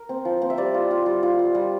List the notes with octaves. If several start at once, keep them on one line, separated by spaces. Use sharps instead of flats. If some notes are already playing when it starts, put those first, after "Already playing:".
Already playing: A#4
C4
F3
C4
E5
G3 D5
F4
F4
G3
F4
G3
G3